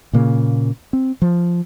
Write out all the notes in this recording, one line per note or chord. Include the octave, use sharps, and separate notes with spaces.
A#2 C#3 A#3
C4
F3